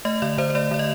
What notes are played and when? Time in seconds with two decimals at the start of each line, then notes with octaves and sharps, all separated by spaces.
0.05 A3 D#5
0.22 D3 D5
0.38 D3 C5
0.50 C5
0.55 A3 D5
0.71 D3 D5
0.79 D#5